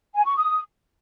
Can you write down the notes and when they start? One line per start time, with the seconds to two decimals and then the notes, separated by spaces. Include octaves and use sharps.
0.15 G#5
0.25 C#6
0.36 D#6